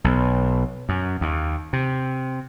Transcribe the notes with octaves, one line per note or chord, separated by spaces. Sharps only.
B1
F#2
D#2
C3